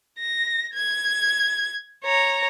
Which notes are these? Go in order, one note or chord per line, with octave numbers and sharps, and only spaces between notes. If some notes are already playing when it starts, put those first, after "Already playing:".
A#6
G#6
C#5 A#5